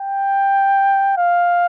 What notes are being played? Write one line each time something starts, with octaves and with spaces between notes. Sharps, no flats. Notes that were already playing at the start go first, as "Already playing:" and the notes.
Already playing: G5
F5